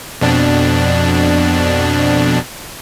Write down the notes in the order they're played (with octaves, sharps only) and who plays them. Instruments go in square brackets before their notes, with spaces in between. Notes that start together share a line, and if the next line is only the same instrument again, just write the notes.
[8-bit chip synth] F2 B2 D4